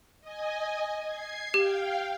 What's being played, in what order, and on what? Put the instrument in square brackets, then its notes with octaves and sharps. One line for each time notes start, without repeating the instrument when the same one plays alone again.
[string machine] D#5 G#5
G#6 C7
[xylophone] G4 [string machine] F5 G5